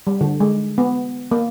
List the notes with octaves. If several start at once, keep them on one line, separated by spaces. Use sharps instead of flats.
G3
D3
G#3
B3
A#3